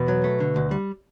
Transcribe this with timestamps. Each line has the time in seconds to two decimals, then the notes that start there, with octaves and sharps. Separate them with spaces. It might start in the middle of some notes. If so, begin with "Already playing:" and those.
Already playing: E2 B2
0.08 F#3
0.24 A3
0.40 D3
0.56 D2
0.71 G3